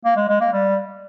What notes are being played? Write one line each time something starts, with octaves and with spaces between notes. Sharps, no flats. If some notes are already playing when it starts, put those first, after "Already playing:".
A#3
G#3
G#3
A#3
G3